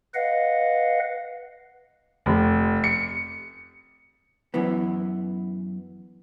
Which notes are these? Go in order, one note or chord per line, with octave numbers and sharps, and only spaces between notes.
B4 D#5 F5 F#5
F1
C#7
F#2 E3 B3